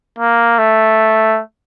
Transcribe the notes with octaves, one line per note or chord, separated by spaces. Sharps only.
A#3
A3